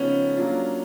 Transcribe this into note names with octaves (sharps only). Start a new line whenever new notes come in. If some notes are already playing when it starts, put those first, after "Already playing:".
Already playing: C#3 F3 G#3 B3 C#4 D#4
F#3 A#3 D4 F4